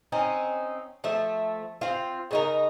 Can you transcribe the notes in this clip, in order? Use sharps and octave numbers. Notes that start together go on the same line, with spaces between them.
C4 C#4 D#4
F3 A3 E5
C4 F4
C#3 D#4 A#4